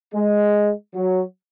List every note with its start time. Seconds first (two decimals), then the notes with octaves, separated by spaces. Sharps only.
0.15 G#3
0.94 F#3